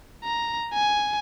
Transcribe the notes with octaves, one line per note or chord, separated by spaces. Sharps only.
A#5
G#5